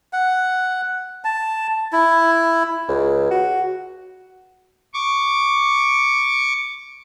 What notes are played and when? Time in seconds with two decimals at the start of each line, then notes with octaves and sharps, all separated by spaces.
0.13 F#5
1.24 A5
1.93 E4
2.88 C#2
3.31 F#4
4.94 C#6 D6